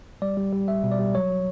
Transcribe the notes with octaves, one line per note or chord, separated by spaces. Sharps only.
G3 D5
G3
G3
G3 E5
B2
D5
G3
F#3 C#5
F#3